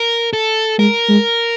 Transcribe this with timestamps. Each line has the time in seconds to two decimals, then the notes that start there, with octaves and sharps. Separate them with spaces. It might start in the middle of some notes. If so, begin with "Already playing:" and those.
Already playing: A#4
0.33 A4
0.79 G#3 A#4
1.09 G#3